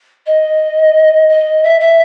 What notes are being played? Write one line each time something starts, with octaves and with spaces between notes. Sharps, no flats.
D#5
D#5
E5
E5